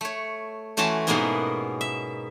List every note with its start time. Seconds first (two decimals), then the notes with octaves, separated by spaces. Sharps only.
0.01 A3 C#5
0.77 E3 A3 C#4 F#4 A5 C6
1.07 G#2 B2 G#3 A#3 B3 E4
1.81 E5